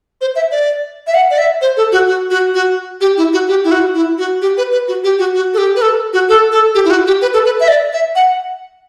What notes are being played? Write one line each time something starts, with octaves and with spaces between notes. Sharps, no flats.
C5
E5
D5
E5
F#5
D5
E5
C5
A4
F#4
F#4
F#4
F#4
G4
E4
F#4
G4
E4
F#4
E4
F#4
G4
B4
B4
F#4
G4
F#4
F#4
A4
G4
B4
A4
F#4
A4
A4
G4
E4
F#4
G4
B4
A4
B4
E5
D5
E5
F#5